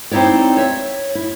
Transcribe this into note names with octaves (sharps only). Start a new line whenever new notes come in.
C4 D#4 E4 C#5 D5
C#5 E5
E4